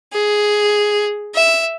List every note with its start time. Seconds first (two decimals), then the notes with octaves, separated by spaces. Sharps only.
0.13 G#4
1.35 E5